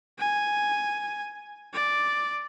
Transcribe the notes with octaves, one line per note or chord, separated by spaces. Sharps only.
G#5
D5